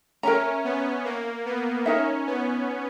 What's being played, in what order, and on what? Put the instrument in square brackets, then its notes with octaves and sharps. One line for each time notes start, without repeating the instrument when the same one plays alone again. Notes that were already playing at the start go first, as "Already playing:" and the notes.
[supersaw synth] C#4 [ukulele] A#4 E5 A#5
[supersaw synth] B3
A#3
B3
[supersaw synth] C#4 [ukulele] D#4 A#4 E5
[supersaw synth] B3